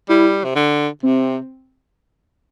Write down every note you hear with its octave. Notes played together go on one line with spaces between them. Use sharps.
G3 E4
C3
D3
C3 C4